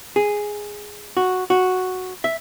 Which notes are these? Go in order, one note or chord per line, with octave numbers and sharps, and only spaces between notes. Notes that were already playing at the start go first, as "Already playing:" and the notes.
G#4
F#4
F#4
E5